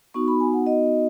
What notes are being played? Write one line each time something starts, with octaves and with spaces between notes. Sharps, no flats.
B3 D#4 F#4 C#6
B5
G#5
F#5
D#5